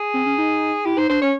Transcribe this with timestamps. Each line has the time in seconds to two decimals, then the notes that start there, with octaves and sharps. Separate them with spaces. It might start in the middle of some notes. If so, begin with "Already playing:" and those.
Already playing: G#4
0.14 C4
0.26 C#4
0.38 D#4
0.85 E4 G4
0.97 D#4 C5
1.10 D4 C5
1.22 C#4 C#5